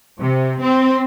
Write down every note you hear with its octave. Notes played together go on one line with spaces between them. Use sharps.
C3
C4